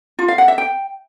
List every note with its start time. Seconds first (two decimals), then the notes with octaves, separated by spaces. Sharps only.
0.19 F4
0.28 F5
0.38 F#5
0.48 E5
0.58 G5